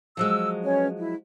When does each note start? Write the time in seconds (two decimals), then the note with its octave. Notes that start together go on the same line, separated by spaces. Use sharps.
0.17 F3 F#3 G#3 E6
0.64 C#4 B4 C#5
0.98 E4